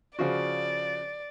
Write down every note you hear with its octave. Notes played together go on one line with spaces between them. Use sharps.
C#3 F3 F#4 D5